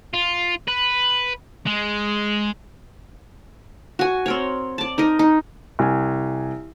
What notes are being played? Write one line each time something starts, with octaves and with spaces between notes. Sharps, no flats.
F4
B4
G#3
F#4 G#5
C4 A#4 C#5
D5 A5
D#4 A#4 D#5
D#4
C2 G#5